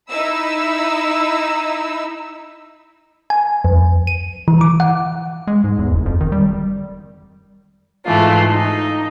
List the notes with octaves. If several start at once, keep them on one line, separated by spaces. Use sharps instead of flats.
D#4 E4 B5 E6
G#5
F2
D#7
E3
D6
F#5
G#3
G#2
E2
F#1
F2
D#3
G3
G#2 E3 A3 F4
D#4